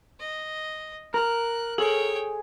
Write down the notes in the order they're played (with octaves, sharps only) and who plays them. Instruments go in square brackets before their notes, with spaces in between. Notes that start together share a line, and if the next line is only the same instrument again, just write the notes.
[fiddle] D#5
[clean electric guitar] A#4 [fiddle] F#6
[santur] G#4 [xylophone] A4 F#7 [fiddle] C#5 G5